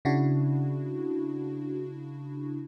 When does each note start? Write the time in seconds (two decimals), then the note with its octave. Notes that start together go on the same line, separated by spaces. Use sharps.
0.05 C#3 D4 E4 F#4